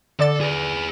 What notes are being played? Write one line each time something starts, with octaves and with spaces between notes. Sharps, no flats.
D3 A4 D5 A6
G#4 B4